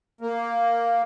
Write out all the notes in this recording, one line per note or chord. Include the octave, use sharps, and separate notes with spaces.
A#3